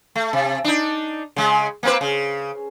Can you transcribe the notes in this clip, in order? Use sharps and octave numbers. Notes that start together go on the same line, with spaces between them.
A3
C3
D4 D#4
C#3 G#3
A#3 C4 B4
C#3